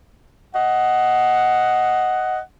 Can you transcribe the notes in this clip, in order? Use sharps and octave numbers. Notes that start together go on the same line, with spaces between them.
D#5 F#5